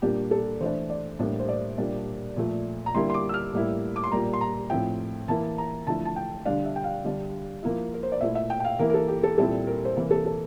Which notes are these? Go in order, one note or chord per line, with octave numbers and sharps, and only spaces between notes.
A#2 G3 A#3 D4 G4
A4
E3 A3 D4 C5
D5
A2 G3 A#3 D4 D5
C5
D5
A#2 G3 A#3 D4
A#2 F3 A3
A#5
D3 G3 A#3 E4 C6
C6
D6
E6
F6
A2 G3 A#3 E4
D6
C6
A#2 G3 A#3 A#5
C6
A#5
A2 F3 C4 E4 G5
E3 A#3 E4 A5
A#5
D3 F3 A3 E4 A5
A5
G5
D3 G3 D4 F5
E5
G5
F5
D3 G3 D4
F3 A#3 E4
A#4
C5
D5
A#2 A3 E4 E5
E5
G5
G5
F5
E3 A#3 E4 A#4
A#4
A4
G4
A4
A#2 G3 C4 E4 A4
A#4
C5
C3 E3 A#3 A#4
A4
A4